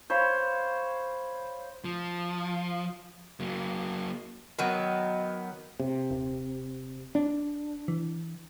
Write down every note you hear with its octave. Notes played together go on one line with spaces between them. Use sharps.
C5 C#5 F5 B5
F3
F#3 A#3
D#3 F#3 B3
C3
D#1
D4
E3